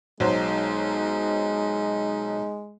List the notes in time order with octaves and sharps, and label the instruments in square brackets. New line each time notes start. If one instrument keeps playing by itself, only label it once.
[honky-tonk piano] B1 F#3 C5 [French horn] G#3 [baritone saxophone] D#4